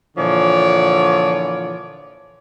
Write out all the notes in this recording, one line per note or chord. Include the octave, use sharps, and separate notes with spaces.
A#2 D3 E3 F3 C#5 D5